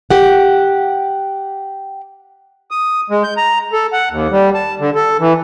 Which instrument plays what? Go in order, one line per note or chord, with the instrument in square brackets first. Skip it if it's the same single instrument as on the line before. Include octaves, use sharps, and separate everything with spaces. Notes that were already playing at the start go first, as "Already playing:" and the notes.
[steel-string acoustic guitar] G4 F#5
[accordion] D#6
G#3
G6
A#5
A4
F#5
D#2
G3
A5
D3
A4
E3